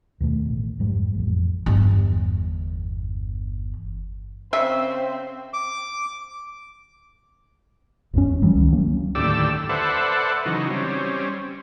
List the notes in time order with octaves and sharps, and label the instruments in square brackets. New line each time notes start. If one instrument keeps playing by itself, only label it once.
[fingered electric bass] D#2 B2 A3
A1
F2 G#2 G3
A1 F2
[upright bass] G1 E2
[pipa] C#3 E5 [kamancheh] C4 C5
[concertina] D6
[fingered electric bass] G#1 E2 G2 C#4
E3 F#3 G3
C#2 D#3
F#3 A#3 C#4
[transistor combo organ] D#2 A2 D3 G4 D5 E6
A4 B4 C5 D5 E5 F#5
C#3 E3 F#3 D#4
G3 C4 C#4